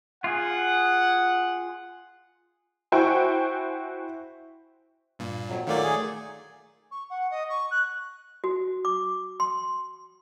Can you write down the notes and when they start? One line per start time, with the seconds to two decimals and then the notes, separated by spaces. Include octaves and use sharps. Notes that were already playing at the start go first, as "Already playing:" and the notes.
0.24 F4 G#4 F#5
2.92 E4 F#4 C5 G5 G#5 C#6
5.19 G2 A#2
5.49 F2 F#3
5.67 A#2 D#3 F#3 A3 A#3 D5
5.84 G#4
6.91 C#6
7.10 F#5
7.30 D#5
7.49 C#6
7.71 F#6
8.44 F#4
8.85 D6
9.40 C6